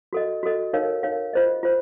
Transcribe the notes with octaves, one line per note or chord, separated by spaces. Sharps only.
F#4 A4 D#5
F#4 A4 D#5
D#4 A#4 C#5 F5
D#4 A#4 C#5 F5
F4 C5 D#5
F4 C5